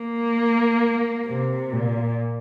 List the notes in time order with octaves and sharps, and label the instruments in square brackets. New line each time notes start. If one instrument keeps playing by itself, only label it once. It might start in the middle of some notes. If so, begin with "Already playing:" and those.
Already playing: [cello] A#3
C3
A#2